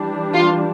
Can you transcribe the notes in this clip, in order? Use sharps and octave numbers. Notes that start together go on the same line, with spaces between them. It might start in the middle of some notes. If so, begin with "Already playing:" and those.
Already playing: E3 G3 D4
F4